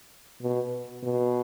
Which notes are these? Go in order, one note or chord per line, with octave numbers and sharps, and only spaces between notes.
B2
B2